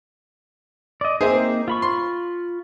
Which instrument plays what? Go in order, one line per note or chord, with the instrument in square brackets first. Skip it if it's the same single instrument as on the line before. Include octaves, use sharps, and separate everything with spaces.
[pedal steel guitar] D5 D#5
[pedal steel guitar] A#3 C4 D#4 [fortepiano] G#4 C5 E5
[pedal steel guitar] F4 B5 C#6
[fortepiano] C6